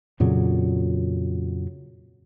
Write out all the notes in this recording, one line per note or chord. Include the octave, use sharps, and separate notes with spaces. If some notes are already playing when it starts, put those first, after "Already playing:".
F2 A#2 C#3 F#3